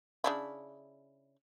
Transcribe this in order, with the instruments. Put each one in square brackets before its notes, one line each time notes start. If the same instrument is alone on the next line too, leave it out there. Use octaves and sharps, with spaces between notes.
[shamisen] C#3 D4 E4